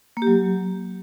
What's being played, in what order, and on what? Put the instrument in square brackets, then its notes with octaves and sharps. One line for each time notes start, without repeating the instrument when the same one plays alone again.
[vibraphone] A#3
G4
F#3